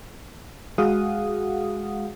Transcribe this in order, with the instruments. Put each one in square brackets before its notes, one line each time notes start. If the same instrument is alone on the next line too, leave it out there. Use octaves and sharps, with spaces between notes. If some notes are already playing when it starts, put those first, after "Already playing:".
[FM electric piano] G#3 F#4 G#4 F5 F#5 D#6